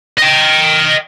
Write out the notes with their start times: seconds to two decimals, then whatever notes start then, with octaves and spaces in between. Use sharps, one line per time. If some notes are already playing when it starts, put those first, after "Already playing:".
0.18 D#5 G5